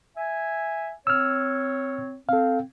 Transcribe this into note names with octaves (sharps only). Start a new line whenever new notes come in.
E5 G#5
C4 C#5 E6 F6
C4 A4 F5